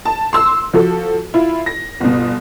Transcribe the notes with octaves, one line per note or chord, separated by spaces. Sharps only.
A5
C6 E6
F3 F#4 A4
E4 F4
A#6
G1 B2